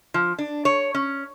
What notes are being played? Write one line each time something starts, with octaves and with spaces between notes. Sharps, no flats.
F3
D4
C#5
C#4